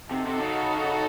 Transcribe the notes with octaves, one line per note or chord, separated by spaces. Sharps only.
C3 D#4 F#4 A4
C3
C#3